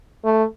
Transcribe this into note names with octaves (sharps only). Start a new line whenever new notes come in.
A3